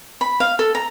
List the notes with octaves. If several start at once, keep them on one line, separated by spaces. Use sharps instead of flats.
B5
F5
A4
A#5